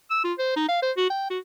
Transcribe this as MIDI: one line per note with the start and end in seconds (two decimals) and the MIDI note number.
0.10 0.21 88
0.24 0.33 65
0.39 0.52 72
0.56 0.68 63
0.69 0.78 77
0.82 0.92 72
0.97 1.10 66
1.10 1.26 79
1.30 1.38 66